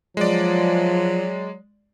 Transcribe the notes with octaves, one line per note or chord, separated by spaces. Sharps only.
F3 F#3 G#3 D5